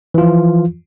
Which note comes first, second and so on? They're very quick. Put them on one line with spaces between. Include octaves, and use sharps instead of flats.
E3 F4 F3